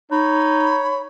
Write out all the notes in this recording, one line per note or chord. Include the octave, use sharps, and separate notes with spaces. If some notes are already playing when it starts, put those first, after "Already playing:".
D#4 C#5 B5